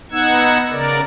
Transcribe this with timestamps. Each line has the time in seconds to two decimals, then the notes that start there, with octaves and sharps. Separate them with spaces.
0.12 B3 D#4 F#5 E6 G#6
0.71 C#3 A#4 D5